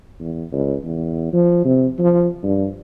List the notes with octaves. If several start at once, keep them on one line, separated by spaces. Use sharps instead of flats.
E2
C#2
E2
F3
C3
F3
G2